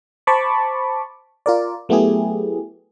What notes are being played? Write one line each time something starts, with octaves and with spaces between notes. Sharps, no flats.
C5 A5 B5 C#6 D6
F4 A#4 D5
F#3 A3 B3 E4 G4 G#4